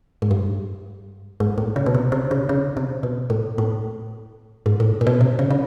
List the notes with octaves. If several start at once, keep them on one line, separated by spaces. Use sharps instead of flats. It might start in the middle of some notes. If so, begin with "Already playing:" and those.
G#2
G2
G#2
A2
C#3
B2
C3
C3
C#3
C#3
C3
B2
A2
A2
G#2
A2
A#2
B2
C3
C#3
C#3